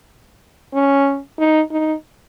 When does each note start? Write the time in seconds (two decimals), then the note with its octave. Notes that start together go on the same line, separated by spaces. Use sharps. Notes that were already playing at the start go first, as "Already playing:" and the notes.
0.74 C#4
1.39 D#4
1.71 D#4